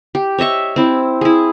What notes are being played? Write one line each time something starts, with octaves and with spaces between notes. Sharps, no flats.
G4
C#5 D#5 E5 C#6
C4 E4
E4 G#4